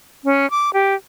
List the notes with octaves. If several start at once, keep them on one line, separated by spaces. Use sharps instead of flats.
C#4
D6
G4